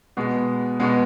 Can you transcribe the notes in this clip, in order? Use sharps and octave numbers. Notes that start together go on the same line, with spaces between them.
B2 G#3 B3
B2 G#3 B3